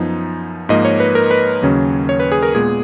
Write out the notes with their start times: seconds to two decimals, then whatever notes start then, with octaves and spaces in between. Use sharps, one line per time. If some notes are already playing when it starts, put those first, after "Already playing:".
Already playing: F#2 F3 B3 D#4
0.69 G#2 F3 A#3 D#5
0.85 C#5
1.00 B4
1.15 A#4
1.31 B4
1.62 D#2 C#3 F#3 C#4
2.09 C#5
2.20 B4
2.32 G#4
2.43 A#4
2.55 A#2 G#3 B3 G#4